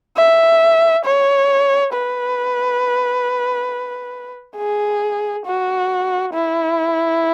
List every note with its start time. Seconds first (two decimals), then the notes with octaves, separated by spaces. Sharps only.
0.17 E5
1.05 C#5
1.93 B4
4.57 G#4
5.46 F#4
6.33 E4